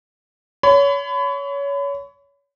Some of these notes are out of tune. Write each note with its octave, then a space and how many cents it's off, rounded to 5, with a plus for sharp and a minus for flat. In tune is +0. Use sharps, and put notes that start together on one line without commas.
C#5 +25 B5 +30